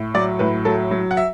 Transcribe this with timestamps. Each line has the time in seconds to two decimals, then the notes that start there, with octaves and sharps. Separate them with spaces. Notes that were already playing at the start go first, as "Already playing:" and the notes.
Already playing: A2
0.14 F#3 D5
0.39 A2 B4
0.65 F#3 A4
0.91 F#3
1.11 F#5
1.17 E5